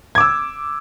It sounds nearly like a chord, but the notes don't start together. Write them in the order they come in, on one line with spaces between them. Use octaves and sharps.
G#6 D6 E6